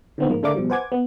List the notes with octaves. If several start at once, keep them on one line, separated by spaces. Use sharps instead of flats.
D3 D#3 B3 C4 D#4
G#2 F3 A#3
D3 A3 D4 A#4 F5 D6
B2 F3 G3
B4 C5 F#5 G#5 D6 G#6
B3